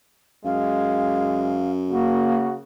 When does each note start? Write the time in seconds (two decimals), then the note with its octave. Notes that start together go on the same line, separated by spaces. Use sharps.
0.44 F#2 G#3 F5
1.90 C#3 A#3 F#4